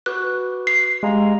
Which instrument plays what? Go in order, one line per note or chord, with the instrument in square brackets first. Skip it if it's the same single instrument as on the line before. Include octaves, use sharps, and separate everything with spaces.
[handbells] F#4 B4 D6 [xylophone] F#6
[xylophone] C7
[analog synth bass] G#3 [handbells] G4 F5 A#5